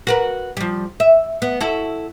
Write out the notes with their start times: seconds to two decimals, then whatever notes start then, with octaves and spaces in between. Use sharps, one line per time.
0.07 F#4 A#4 B4
0.57 F3 G3
1.00 E5
1.42 B3
1.60 E4 F#4 A4